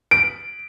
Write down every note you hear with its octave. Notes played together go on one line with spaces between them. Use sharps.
D7